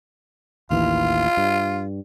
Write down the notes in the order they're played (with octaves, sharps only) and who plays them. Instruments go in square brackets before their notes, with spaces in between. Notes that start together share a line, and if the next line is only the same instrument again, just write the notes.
[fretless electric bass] A1 D#2 E3 [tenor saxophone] F4
[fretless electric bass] G2